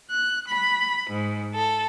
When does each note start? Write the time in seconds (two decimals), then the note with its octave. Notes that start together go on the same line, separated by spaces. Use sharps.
0.12 F#6
0.49 B5
1.11 G#2
1.55 A4